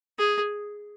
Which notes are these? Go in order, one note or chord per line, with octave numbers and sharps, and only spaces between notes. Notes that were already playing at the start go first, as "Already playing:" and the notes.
G#4